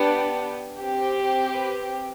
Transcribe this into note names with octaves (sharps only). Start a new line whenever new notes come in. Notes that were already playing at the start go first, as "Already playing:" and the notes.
Already playing: B3 D4 G4
C4 G4
B4